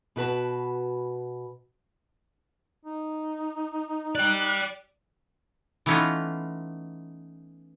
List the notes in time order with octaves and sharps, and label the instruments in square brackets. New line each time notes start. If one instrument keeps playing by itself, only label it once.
[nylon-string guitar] B2 F#4 B4 A5
[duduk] D#4
[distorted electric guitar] D5 G5 [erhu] F#6
[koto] E3 A3 B3 C#4 D#4 F4